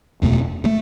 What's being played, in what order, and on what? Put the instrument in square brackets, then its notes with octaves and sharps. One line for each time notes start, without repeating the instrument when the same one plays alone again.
[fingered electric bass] F#1 E2 B2 A3
B2 A3